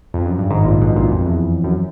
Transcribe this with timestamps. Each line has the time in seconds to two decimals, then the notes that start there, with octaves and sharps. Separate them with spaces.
0.14 F2
0.26 F#2
0.38 G2
0.50 G#1 G#2
0.65 A#1 A#2
0.81 B1 B2
0.96 A#1 A#2
1.12 F2
1.26 E2
1.64 F#2